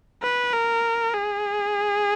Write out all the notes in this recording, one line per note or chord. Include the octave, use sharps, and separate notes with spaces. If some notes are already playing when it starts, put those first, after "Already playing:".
B4
A#4
G#4